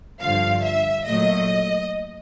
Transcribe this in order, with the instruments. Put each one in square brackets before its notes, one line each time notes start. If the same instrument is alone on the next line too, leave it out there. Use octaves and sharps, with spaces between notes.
[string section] G2 D3 F3 F5
E5
A#2 F#3 A3 D#5